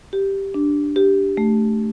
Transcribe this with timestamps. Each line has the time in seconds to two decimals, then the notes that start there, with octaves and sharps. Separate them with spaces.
0.13 G4
0.54 D4
0.96 G4
1.37 A3